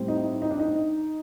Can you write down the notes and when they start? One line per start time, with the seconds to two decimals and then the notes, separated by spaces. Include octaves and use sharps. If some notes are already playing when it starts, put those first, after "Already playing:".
Already playing: A2 G3 C4
0.08 D#4
0.42 D#4
0.50 D4
0.60 D#4